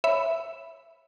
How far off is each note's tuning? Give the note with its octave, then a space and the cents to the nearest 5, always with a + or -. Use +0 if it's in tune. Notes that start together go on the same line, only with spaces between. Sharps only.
C#5 +0 E5 +5 B5 +10